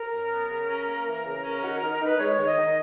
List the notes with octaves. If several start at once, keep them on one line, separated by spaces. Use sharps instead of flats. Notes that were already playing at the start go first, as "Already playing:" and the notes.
Already playing: A#4
F#2
B3
C#3
C#4
A#3
E3
C#3
C#4
D#3 F#4
D#3 A#4
A#4
D#4 B4
G#3 C#5
D#3
D#5
D#3